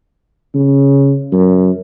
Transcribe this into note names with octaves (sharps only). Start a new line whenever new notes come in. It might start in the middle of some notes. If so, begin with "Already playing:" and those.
C#3
F#2